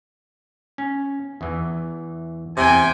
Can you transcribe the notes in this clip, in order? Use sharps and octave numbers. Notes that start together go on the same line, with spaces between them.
C#4
E2 E3
E2 C3 C4 G5 G#5